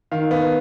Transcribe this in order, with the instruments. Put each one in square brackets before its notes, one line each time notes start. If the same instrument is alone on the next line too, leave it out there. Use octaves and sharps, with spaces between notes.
[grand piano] D#3 [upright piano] F5
[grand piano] B3